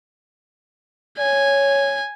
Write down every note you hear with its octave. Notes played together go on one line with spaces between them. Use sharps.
C#5 G#5